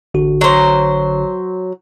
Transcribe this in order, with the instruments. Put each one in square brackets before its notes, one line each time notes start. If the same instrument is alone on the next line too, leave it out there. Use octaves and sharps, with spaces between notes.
[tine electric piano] A1 D3 F#4
[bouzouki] F#3 C5